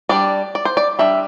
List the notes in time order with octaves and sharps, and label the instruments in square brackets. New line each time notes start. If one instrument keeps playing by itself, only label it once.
[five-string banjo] G3 D4 D5
D5
C5
D5
G3 D4 E5